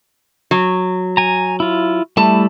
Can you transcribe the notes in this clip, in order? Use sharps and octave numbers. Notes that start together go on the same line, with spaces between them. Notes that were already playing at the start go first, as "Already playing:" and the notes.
F#3
G#5 A#5
E4 F4
G3 A3 E4 A5